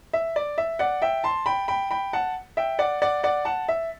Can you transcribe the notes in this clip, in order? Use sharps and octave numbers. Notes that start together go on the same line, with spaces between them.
E5
D5
E5
D5 F#5
E5 G5
A5 C6
G5 B5
G5 B5
G5 B5
F#5 A5
E5 G5
D5 F#5
D5 F#5
D5 F#5
F#5 A5
E5